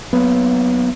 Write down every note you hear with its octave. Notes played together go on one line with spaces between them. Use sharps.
F#3 A#3 B3